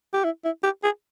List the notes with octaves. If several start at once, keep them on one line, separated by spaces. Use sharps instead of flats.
G4
E4
E4
G4
G#4